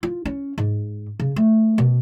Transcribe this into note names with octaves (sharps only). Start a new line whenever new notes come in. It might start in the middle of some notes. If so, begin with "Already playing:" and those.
F4
C#4
G#2
C#3
A3
B2